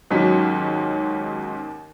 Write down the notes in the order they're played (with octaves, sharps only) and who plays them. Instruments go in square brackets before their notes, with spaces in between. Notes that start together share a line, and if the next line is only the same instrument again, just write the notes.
[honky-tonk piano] D#2 B6 [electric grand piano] G#2 C#4 D#4 [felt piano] F#3